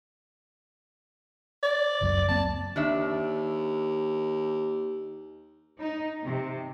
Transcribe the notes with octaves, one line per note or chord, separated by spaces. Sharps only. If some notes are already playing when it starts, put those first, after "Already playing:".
D5
F#1 C#2 F#2
F#3 A#3 C4 A5
D#2 D#3 D4 E5
D#4
C3